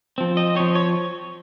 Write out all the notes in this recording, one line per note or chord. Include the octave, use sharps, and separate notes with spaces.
F3 C4
D#5
F3 C4 C#5
C#5